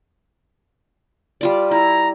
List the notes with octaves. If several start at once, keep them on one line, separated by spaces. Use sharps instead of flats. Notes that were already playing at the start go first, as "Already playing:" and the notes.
G3 F4 D5
E4 A#5